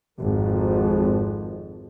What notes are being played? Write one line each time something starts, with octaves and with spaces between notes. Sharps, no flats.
G#1 F2